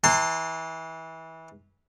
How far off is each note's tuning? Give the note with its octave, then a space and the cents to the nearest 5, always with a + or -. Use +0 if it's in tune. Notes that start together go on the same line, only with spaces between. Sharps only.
E3 -25 A5 +35 C6 +0